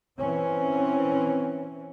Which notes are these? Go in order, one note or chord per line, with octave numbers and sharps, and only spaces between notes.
E3 C4 C#4